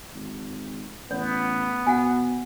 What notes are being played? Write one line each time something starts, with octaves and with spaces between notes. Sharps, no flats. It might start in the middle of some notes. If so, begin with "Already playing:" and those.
G#1
A1 B3 C#5
B2 F#5 G#5